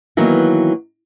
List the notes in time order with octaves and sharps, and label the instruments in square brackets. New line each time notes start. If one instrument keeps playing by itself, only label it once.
[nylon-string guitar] D#3 E3 F#3 A#3 B3